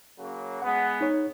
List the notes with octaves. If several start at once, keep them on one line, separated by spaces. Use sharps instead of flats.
C#3 F#3 A#3
G#3 B3 F#5
D#4 C#5